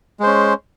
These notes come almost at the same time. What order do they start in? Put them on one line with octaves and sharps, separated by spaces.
G#3 C5 C#4